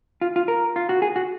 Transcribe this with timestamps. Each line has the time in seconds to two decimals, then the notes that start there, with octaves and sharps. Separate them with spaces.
0.21 F4
0.36 F4
0.48 A#4
0.76 F4
0.89 F#4
1.02 G#4
1.16 F#4